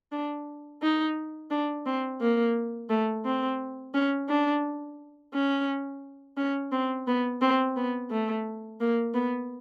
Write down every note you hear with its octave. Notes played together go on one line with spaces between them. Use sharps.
D4
D#4
D4
C4
A#3
A3
C4
C#4
D4
C#4
C#4
C4
B3
C4
B3
A3
A#3
B3